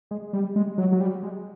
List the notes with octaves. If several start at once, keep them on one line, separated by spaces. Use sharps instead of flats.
G#3
G3
G#3
F#3
F#3
G3
G#3